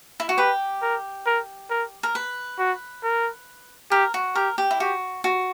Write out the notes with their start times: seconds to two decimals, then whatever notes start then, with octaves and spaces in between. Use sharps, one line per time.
0.20 E4
0.29 F#4
0.38 G4 B4
0.82 A#4
1.26 A#4
1.70 A#4
2.03 A#4
2.15 B4
2.59 F#4
3.03 A#4
3.91 G4 A#4
4.14 F#4
4.35 G4 A#4
4.58 G4
4.71 E4
4.80 F#4 G4
5.24 F#4